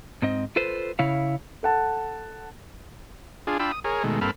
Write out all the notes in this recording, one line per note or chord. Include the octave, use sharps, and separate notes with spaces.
G#2 C4 D#5
F4 A4 B4 C5
C#3 E4 C#5 F5
A4 F#5 A5
D4 F4 G#4
D4 F4 G5 B5 E6
D#6
G#4 A#4 C#5
B2 D#3 G#3 A3
G2 A#3 C4 A4 B5 F6